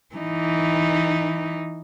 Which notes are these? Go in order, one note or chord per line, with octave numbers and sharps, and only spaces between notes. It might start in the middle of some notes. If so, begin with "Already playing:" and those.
E3 D#4